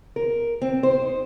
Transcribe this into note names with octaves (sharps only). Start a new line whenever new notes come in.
A#4
C4
C5
D#4